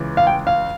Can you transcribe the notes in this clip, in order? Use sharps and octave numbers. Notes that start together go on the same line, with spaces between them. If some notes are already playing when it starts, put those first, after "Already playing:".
Already playing: C#2 C#3 E3
F5
G5
F5